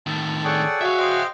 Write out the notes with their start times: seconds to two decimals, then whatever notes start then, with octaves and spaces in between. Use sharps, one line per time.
0.06 A2 D#3 A5
0.45 G#4 A4 C#5 D5 F#5 G5
0.81 F#4 E5 F5
0.98 C5 D#5 G5